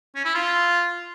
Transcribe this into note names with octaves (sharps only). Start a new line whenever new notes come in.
C#4
E4
F4